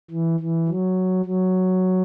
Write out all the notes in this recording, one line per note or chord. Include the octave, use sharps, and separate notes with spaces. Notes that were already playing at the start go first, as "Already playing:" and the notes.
E3
E3
F#3
F#3